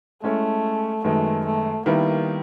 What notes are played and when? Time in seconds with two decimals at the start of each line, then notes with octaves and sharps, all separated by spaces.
0.23 G#3 A3 C#4 E4 A4
1.04 F#2 D#3 G#3 A3 B3
1.46 A3
1.86 D#3 G3 A#3 B3 E4